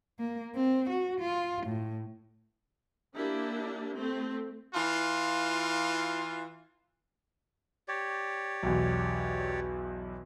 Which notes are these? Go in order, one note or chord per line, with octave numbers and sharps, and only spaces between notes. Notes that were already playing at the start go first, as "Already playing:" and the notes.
A#3
C4
F#4
F4
A2
A#3 D4 E4 G4
A3 C4
E3 F4
G4 C#5 D5
B1 E2